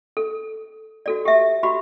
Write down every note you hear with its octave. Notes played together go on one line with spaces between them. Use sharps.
A4
F#4 A4 D5
G4 E5
F#4 G4 B5